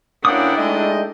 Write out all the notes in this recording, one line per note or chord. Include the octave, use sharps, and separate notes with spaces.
D2 A#3 C#4 D4 E4 F#5 G5 D#6
G#3 A3 D#4 D5 D#5